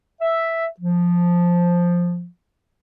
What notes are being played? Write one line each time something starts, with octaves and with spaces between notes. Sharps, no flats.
E5
F3